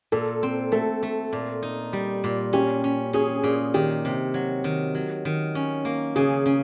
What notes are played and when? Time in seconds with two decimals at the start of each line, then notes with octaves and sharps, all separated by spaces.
0.12 A#2 A4
0.43 C4
0.72 A3 A4
1.03 A3
1.33 A#2
1.63 D#4
1.93 G3
2.24 A#2
2.53 C#4 G4
2.84 C#4
3.13 C#4 G#4
3.43 A#2
3.74 D#3 G4
4.05 C3
4.34 F#3
4.64 D#3
4.95 F#3
5.25 D#3
5.55 C#4
5.85 A#3
6.16 C#3 G#4
6.46 C#3